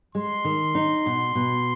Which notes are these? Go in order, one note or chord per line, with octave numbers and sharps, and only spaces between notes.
G#3 C6
D#3
D#4
B2
B2